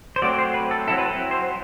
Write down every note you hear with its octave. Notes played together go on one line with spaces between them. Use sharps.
C5
F#3 A3 C4 D5
C5
B4
A4
F#3 C4 E4 A4
B4
A4
C5